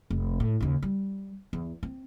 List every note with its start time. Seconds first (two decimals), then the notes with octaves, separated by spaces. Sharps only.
0.10 F1
0.40 A2
0.61 D#2 C#3
0.83 G3
1.53 E2
1.83 C4